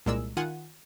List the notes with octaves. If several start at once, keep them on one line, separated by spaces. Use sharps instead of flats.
C2 A#2 G#3 A#4 D5 E6
D#3 F4 F#5 G#5 D#7